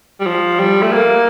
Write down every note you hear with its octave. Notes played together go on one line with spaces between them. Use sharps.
G3
F3
G3
A3
A#3